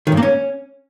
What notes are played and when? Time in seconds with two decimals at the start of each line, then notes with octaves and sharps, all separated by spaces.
0.07 D#3
0.12 G2
0.17 A#3
0.22 C#4